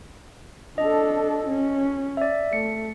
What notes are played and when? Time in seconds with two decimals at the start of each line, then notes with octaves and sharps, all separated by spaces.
0.78 D4 A4 D#5
1.47 C#4
2.17 D5 E5
2.53 A3 C#7